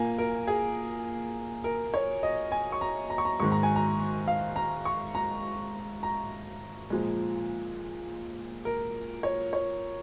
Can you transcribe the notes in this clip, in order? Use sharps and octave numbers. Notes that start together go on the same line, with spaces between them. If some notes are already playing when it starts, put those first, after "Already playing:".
Already playing: A#2 A#3 G#5
A#4
G#4
A#4
C#5
D#5
G#5
C#6
A#5
A#5
C#6
A#5
G#2 D#3 G#3 C#6
A#5
G#5
A#5
F5
A#5
C#6
A#5
A#5
A#2 F3 G#3
A#4
C#5
C#5